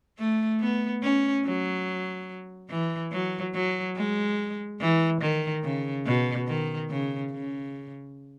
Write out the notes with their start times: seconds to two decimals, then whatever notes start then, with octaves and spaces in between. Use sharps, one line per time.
0.19 A3
0.60 B3
1.03 C#4
1.45 F#3
2.70 E3
3.12 F#3
3.54 F#3
3.96 G#3
4.80 E3
5.21 D#3
5.63 C#3
6.06 B2
6.48 D#3
6.90 C#3
7.32 C#3